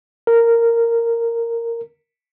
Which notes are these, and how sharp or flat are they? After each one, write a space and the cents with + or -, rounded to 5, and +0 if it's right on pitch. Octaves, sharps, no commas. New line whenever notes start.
A#4 -10